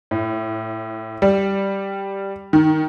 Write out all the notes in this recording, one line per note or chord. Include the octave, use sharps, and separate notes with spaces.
A2
G3
D#3